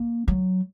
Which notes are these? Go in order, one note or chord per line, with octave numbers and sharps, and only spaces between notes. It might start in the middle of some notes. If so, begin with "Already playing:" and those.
Already playing: A#3
F#3